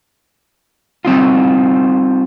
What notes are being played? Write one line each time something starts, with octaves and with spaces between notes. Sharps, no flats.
G3 C4 D#4 F4